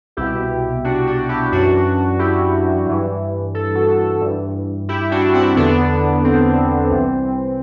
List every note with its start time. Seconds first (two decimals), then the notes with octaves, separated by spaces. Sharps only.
0.17 C2 B2 E4 G4
0.84 D4 F#4
1.07 D4 F#4
1.29 E4 G4
1.52 F#2 E3 D4 F#4
2.19 E4 G4
2.86 G2 E3
3.54 A4
3.75 F#4 A4
4.21 G2 E3
4.89 E4 G4
5.11 D4 F#4
5.34 C4 E4
5.49 E4
5.56 E2 D3 B3 D4
6.24 C4
6.91 C2 C3 E3